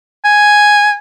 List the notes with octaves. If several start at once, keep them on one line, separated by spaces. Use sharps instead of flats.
G#5